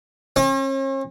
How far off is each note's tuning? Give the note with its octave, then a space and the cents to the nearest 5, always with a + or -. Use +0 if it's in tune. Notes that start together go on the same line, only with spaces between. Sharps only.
C#4 -45